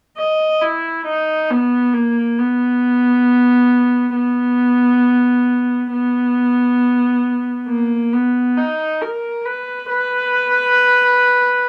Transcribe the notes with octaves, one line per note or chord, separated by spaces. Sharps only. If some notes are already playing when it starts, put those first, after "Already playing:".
D#5
E4
D#4
B3
A#3
B3
B3
B3
A#3
B3
D#4
A#4
B4
B4